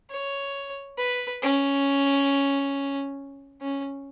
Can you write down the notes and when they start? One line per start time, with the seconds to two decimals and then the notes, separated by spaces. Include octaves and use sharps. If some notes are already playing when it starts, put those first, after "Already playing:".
0.10 C#5
0.98 B4
1.42 C#4
3.62 C#4